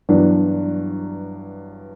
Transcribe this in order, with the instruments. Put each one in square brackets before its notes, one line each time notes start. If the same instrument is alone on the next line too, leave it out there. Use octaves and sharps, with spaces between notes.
[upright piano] G2 E3 F#3 B3 D4